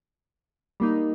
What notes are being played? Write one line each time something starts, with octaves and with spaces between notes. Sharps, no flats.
G3 A#3 D#4